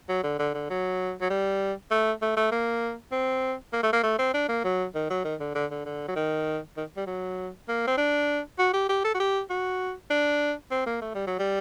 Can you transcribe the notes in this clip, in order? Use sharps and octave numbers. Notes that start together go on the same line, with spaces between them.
F#3
D3
D3
D3
F#3
F#3
G3
A3
A3
A3
A#3
C4
A#3
A3
A#3
A3
C4
D4
A#3
F#3
D#3
F#3
D#3
D3
D3
D3
D3
F#3
D#3
D#3
G3
F#3
A#3
C4
D4
F#4
G4
G4
A4
F#4
G4
F#4
D4
C4
A#3
A3
G3
F#3
G3